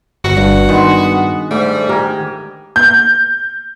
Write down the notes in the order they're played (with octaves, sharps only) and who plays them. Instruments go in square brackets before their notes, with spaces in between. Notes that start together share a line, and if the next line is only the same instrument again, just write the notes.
[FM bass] G1 [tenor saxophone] F#4
[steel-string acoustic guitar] G2
[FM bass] D#3 [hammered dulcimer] G#3 B3
[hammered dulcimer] G#2 [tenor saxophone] G3 [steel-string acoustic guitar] A3
[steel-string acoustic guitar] G4 [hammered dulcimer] A#4 G#5
[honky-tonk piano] G6